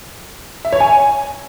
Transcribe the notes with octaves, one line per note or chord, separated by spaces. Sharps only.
E5
C#5
G#5